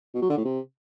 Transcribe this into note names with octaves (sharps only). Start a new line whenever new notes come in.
B2
F#3
D3
A2
C3